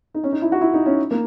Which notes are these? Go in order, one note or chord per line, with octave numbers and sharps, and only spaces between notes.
D#4
C#4
D#4
E4
F#4
E4
D#4
C#4
A#3